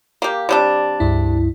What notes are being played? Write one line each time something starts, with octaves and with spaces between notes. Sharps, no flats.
A#3 G4
C3 G3 D4
C#2 G2 E4